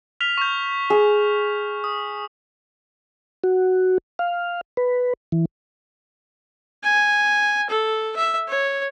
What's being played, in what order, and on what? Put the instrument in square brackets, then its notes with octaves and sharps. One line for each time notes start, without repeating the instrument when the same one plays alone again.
[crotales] F6 B6 F7
C#6 G6
[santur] G#4
[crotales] D#6
[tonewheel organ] F#4
F5
B4
E3
[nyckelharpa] G#5
A4
E5
C#5